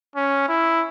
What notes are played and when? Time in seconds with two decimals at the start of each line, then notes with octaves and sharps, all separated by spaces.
0.16 C#4
0.49 E4